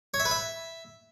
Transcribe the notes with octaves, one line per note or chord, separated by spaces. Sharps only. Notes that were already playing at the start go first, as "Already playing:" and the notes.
C#5
E5
B4
E5